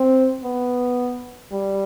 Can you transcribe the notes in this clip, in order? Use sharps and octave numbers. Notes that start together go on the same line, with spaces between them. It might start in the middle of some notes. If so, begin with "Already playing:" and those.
Already playing: C4
B3
G3